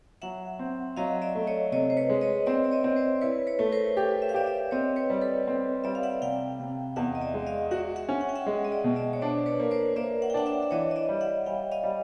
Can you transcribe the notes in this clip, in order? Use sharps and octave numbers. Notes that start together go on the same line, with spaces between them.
F#3 E5 F#5
C4
F#3 D#5 F5
D5 E5
A3
C#5 D#5
C3 C#5 D#5
C5
B4 C#5
G#3
C#5 D#5
C4 D5 E5
D5
C#5 D#5
C4
C5 D5
E4 B4 C#5
B4 C#5
A3
A#4 C5
G4 A4 B4
E5
F5
G4 D5 E5
D5 E5
C4 C#5 D#5
B4 C#5
G3
A4 B4
C4
G3 D5 E5
F5
E5 F#5
C3 F5 G5
C3
E2 E5 F#5
D#5
D5 E5
G#3
D#5 F5
F#4 E5 F#5
E5 F#5
C#4
F#5
G5
E5 F#5
G#3
D#5
D5 E5
B2
D5 E5
C#5
D4 C5 D5
B4 C#5
A#3
C5 D5
A#3 D5 E5
F#5
G5
D4 E5 F#5
E5 F#5
E5
E3 C#5 D#5
D#5
D5 E5
G3
E5 F#5
G3 F5 G5
D#5 F5
G3